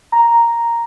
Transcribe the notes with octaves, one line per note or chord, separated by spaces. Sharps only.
A#5